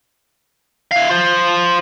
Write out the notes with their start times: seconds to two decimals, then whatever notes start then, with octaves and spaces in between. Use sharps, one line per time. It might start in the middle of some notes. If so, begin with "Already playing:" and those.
0.91 E4 F5
1.09 F4 C5